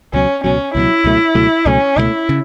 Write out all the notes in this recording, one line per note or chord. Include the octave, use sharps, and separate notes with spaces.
C#2 B2 F#3 C#4
C#2 B2 F#3 C#4
C#2 B2 F#3 E4
C#2 B2 F#3 A3
C#2 B2 F#3 A3
C#2 B2 F#3 A3 C#4
C#2 B2 F#3 A3 E4
C#3